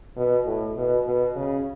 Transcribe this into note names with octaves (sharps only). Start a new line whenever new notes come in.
B2
A2
B2
B2
C#3